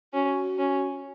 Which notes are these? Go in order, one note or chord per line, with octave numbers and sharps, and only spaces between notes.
C#4 F#4
C#4